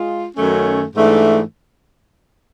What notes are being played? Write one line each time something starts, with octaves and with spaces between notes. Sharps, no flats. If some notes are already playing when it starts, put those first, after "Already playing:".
Already playing: G#3 F4
F#2 D#3 F#3 A3 C#4
G#2 E3 A3 D4